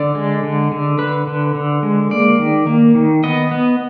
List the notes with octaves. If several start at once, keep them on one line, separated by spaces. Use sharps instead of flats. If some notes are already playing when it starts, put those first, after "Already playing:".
Already playing: D3 D5
G#3
D3
D3
D3 B4
D3
D3
G#3
A#3 D5
D#3
A#3
D#3
B3 D#5
B3